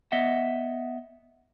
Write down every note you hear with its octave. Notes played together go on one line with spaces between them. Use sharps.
B3 D#5 E5 F#5